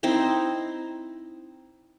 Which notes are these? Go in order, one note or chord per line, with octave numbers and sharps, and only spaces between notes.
C4 D#4 E4 C5